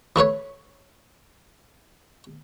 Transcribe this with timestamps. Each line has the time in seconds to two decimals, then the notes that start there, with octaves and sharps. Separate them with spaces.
0.16 E3 A3 B4 C#5